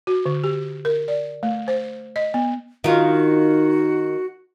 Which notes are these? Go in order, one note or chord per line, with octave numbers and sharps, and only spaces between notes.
F#4
D3
G4
A#4
D5
A3
C5
D#5
B3
D#3 F4 F#4